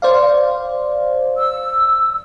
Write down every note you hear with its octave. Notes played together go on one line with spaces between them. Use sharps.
C5 D5 F5
E6